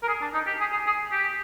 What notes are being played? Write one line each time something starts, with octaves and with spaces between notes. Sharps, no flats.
A#4
G#4
D4
D#4
G4
G#4
G#4
G#4
G4